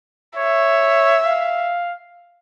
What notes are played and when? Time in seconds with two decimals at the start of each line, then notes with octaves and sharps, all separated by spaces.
0.38 C#5 E5
1.26 F5